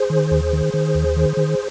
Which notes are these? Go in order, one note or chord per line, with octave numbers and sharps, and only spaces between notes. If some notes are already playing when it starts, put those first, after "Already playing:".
Already playing: G#4 C5
D#3
D#2
D#3
D#3
D#2
D#3
D#3